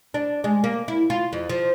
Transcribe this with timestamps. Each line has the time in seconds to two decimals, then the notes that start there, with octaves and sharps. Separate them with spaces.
0.14 D4
0.44 G#3
0.64 A#3
0.88 E4
1.10 F4
1.33 F2
1.49 F3